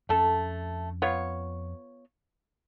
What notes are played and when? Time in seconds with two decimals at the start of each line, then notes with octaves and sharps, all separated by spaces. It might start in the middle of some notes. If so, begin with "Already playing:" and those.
0.09 F2 A3 C#4 A4
1.02 B3 F4 C#5